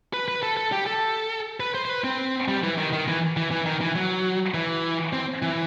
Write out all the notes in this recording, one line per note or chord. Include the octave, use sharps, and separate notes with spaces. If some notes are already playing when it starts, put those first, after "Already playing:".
B4
B4
A4
A4
G4
A4
B4
C5
C5
B4
C4
G3
E3
D#3
D#3
E3
E3
E3
D#3
E3
F#3
E3
C4
E3